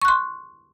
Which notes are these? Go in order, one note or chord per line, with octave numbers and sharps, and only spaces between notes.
C6 C#6 F#6